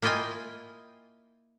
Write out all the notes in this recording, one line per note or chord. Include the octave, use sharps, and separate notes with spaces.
A#3 E4 F4 D#5 G5 G#5